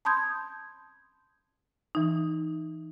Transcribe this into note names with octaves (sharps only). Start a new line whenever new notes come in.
A5 B5 C6 D#6 G6 G#6
E3 D#4